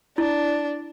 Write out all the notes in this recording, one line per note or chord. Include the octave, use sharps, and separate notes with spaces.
D4 E4